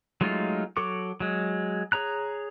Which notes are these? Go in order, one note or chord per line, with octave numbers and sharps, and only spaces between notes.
F#3 G#3 A3 D#4 F4
F#3 A4 C#6 D6
F#3 G#3
G#4 C#5 A#5 F#6